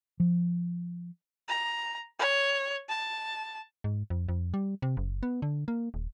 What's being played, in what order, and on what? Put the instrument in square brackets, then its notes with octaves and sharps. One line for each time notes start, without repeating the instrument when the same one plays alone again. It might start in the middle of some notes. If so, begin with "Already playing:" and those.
[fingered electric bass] F3
[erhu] A#5
C#5
A5
[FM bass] G#2
F2
F2
G3
C3
F#1
B3
D3
A#3
D#1